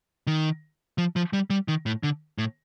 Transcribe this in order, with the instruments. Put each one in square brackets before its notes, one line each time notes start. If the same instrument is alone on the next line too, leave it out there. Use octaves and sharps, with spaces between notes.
[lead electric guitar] D#3
F3
F3
G3
G3
D#3
A2
D3
A2